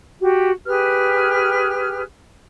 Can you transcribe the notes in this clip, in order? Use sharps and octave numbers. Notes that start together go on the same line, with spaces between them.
F#4 G4
G4 G#4 B4 F6